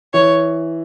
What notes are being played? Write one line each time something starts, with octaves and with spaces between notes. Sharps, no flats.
E3 C#5